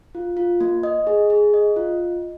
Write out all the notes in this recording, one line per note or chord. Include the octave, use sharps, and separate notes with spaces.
F4
F4
A#3
D#5
G#4
G#4
D#5
F4
D#5